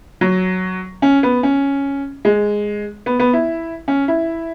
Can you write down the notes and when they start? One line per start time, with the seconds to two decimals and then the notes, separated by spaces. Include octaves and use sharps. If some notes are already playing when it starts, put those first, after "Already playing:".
0.21 F#3
1.02 C#4
1.23 B3
1.43 C#4
2.25 G#3
3.06 B3
3.20 B3
3.33 E4
3.88 C#4
4.08 E4